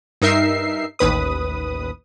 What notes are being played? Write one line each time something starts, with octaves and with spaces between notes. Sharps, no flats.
G2 D#4 A#4 E5 C7
A1 D#2 B4 D#6